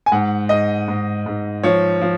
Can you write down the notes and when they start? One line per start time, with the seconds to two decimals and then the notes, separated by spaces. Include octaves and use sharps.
0.06 G#5
0.12 G#2 F#5
0.49 G#2 D#5
0.88 G#2
1.26 G#2
1.64 F3 C#5
2.01 F3